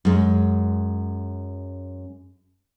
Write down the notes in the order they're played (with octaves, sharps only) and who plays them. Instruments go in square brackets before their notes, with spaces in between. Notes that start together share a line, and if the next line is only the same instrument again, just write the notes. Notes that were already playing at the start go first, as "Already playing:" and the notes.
[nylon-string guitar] F#2 G#3